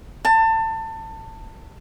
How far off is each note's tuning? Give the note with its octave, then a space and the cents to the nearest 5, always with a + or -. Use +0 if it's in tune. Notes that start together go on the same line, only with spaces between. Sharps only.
A5 +25